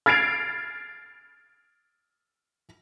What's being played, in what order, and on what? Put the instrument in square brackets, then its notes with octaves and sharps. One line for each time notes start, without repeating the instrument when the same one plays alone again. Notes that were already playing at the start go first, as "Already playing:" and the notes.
[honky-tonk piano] F6 G#6 A6 C7 D7 F7